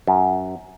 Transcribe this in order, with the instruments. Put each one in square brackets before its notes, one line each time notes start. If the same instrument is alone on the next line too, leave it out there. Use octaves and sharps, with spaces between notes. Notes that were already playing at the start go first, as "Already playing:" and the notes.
[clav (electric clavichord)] F#2